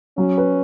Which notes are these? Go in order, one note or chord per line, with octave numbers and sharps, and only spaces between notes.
F#3 C#4
B4